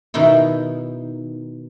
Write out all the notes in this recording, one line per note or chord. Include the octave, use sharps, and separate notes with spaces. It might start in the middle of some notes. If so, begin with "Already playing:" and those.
B2 D#3 D#4 E4